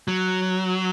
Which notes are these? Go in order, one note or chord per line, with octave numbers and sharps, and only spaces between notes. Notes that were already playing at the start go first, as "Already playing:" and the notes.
F#3